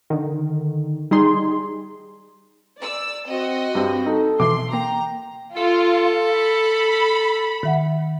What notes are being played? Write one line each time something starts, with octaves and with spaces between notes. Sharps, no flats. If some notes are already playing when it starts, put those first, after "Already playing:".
D3 D#3
G3 D#4 G#4 C6
D5 E6
C4 F#4 D#5
G2 C4 G4
D#4 A4
B2 E3 C6 D6
A#3 G5 A#5
F4 A4
B5
D#3 E5 F#5